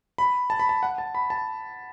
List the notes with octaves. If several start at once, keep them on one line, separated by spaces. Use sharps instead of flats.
B5
A5
B5
A5
F#5
A5
B5
A5